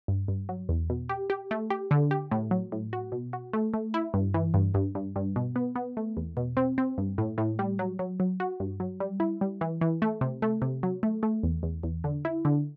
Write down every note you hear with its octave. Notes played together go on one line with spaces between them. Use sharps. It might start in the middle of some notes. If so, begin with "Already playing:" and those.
G2
G2
F#3
E2
B2
G4
G4
A3
G4
D3
G4
A2
F#3
A2
F#4
B2
F#4
A3
A3
E4
G2
E3
G2
G2
G2
G2
B2
B3
B3
A3
E2
B2
C4
C4
G2
A2
A2
G3
F#3
F#3
F#3
F#4
G2
F#3
G3
E4
G3
E3
E3
A3
C3
A3
C3
F#3
A3
A3
E2
E2
E2
D3
E4
D3